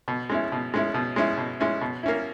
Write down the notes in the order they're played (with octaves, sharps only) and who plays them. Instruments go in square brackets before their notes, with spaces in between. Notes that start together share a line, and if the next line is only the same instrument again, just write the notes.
[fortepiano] B2
G#3 C#4 E4
B2
G#3 C#4 E4
B2
G#3 C#4 E4
B2
G#3 C#4 E4
B2
A#3 C#4 E4